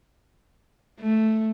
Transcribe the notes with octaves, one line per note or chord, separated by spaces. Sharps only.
A3